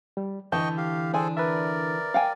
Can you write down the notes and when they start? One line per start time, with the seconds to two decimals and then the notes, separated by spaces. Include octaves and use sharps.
0.17 G3
0.52 D3 E3 D#5 G5 A5 C#6 G6
0.77 G4 F5
1.14 D4 G#4 A4 C5 G#5
1.37 A#4 B4 D5 E5
2.14 F5 G5 G#5